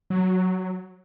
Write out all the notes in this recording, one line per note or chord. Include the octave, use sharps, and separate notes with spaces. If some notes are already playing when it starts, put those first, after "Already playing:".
F#3